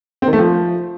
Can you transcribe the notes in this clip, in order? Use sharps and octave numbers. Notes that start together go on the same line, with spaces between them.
C4
D#3
A3
F3